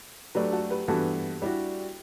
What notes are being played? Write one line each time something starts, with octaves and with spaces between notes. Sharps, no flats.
F#3 A3 D4 G4 B4
F#4 A4
G4 B4
G2 E3 B3 F#4 A4
G3 D4 E4 F#4 G4